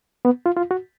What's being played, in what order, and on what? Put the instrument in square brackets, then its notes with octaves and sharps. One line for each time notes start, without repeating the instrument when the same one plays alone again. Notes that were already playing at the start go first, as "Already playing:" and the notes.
[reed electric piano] B3
F4
F4
F#4